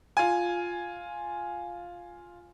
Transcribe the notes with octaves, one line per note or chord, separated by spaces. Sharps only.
F4 G#5